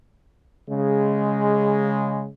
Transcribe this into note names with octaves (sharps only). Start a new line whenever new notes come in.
C#3 G#3